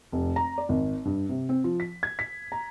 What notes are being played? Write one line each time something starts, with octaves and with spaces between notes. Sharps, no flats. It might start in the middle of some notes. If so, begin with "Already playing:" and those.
F1
A#5
D5
G#1
G2
C3
C4
F3
B6
G#6
B6
A#5